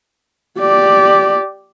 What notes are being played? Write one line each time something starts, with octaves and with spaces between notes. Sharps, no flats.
G4 D5